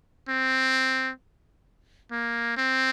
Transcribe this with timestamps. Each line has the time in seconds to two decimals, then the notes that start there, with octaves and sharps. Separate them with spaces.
0.29 C4
2.11 A#3
2.57 C4